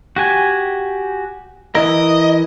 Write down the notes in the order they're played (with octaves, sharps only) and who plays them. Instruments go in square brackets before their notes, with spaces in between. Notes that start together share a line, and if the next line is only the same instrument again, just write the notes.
[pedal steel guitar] F#4 G4 G#5
[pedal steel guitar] E3 E4 A#4 [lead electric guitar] D#5